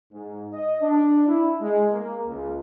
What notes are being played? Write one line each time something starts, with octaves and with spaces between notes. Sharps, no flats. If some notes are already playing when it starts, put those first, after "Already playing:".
G#2
D#5
D4
E4
G#3
A#3
C#2